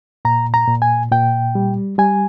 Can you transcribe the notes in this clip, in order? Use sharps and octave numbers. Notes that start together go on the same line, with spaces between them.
A#2 A#5
A#5
A#2
G#5
A#2 G5
G3
G3 G#5